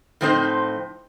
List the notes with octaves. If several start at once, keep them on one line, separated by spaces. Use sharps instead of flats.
A2 F3 C4 D#4 C5